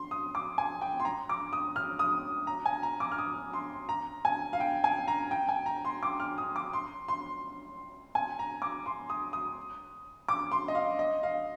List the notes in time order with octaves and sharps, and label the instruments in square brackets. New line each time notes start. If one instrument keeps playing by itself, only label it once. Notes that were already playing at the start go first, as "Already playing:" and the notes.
Already playing: [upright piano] C6
D#6
D6
G#5
G5
C6
A#5
D6
D#6
F6
D#6
A#5
G#5
A#5
D6
F6
D#6
C6
A#5
G#5
F5
G5
G#5
A#5
G5
G#5
A#5
C6
D6
F6
D#6
D6
C6
C6
G#5
A#5
D6
C6
D#6
D#6
D6
C6
D#5
F5
D#5
F5